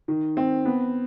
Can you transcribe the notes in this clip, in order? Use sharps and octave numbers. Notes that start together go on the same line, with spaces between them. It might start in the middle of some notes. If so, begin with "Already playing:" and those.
D#3
C4
B3